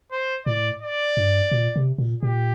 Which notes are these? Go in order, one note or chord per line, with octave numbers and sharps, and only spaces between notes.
C5
A2 D5
D5
G2
A#2
C3
A#2
A#2 G4